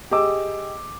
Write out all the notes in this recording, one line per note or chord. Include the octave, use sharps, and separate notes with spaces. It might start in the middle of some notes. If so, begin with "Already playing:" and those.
G4 G#4 D#5 D6 E6